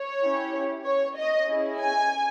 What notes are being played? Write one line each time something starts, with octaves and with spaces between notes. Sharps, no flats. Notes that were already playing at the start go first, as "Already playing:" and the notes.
Already playing: C#5
C#4 E4 G4
C#5
D#5
C#4 E4 G#4
G#5